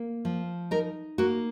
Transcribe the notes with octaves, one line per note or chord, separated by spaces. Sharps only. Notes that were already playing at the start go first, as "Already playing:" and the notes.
Already playing: A#3
F3
D#4 A#4
A#3 F#4